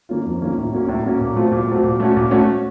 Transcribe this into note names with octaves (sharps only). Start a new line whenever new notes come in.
D#3 A#3 C#4 F4
F2
D#3 A#3 C#4 F4
A2
F#3 A#3 C#4
A2
F#3 A#3 C#4
A#2
F#3 A3 C4 F4
A#2
F#3 A3 C4 F4
A#2
A3 C#4 F#4
A#2
A3 C#4 F#4